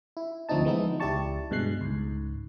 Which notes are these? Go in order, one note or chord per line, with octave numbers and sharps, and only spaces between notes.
E4
D2 F3 C4 D4 D#4 A5
E3 F3 G#3 B3 D#4 E4
C#2 E4 G4 D5 A5 C#6
G2 B2 G#3 F#6 C7
C#2 G#2